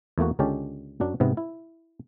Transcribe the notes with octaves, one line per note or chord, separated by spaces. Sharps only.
E2 A3 A#3 F#4
C#2 D3 G#3 C#4 G4 A5
F#2 F#3 D4
G#2 C3 B3
E4